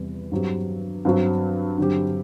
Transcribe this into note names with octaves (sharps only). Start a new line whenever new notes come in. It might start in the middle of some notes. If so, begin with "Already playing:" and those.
Already playing: E2 C3 G3 B3
G2 F#3 C4 G4
G2 F#3 C4 F#4
G2 D3 F#3 C4 G4